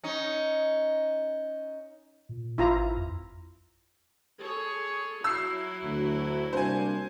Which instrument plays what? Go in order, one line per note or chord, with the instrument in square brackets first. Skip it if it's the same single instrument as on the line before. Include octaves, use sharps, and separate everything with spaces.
[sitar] C#4 D#4
[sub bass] A#2
[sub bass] G#1 [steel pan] E4 F4 A#5
[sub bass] F2
[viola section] G#4 A4 C#5
[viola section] F#3 E4 [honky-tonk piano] E6 C7
[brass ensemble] D2
[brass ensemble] C2 A#3 D4 [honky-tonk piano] C5 G#5